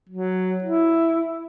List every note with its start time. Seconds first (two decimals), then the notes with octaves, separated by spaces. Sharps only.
0.09 F#3
0.64 E4